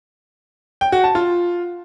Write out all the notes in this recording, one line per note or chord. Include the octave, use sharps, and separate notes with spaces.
G5
F#4
A5
F4